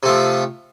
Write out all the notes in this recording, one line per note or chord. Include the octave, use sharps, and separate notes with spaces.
C3 F3 A3